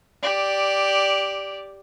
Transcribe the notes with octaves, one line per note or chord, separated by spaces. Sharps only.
G4 D5